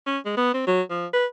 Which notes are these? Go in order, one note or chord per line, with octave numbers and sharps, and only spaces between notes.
C#4
G#3
B3
C4
F#3
F3
B4